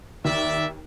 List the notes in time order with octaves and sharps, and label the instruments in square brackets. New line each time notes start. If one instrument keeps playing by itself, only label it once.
[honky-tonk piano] D#2 [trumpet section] D5 E5